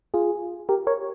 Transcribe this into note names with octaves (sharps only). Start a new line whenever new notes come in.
F4 G#4
G4 A#4
A#4 C#5